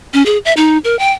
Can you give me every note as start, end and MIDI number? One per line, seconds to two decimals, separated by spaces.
0.14 0.25 61
0.26 0.38 68
0.45 0.53 76
0.57 0.78 63
0.84 0.98 70
0.99 1.11 79